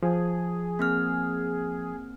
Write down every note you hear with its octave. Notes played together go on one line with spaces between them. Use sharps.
F3 G#4
A#3 C4 F6